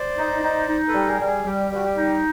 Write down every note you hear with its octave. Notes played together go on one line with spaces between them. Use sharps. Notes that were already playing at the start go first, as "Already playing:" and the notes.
Already playing: C5 D5
D#4
D#4
D#4
A4 B4
G3
G#4 A#4
G3
G#4
G3 G4
G3 F#4
G4
D#4